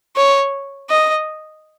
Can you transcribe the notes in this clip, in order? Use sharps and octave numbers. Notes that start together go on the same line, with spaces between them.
C#5
D#5